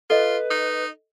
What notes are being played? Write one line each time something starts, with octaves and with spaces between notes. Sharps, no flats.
F4 A4 B4 D#5
D#4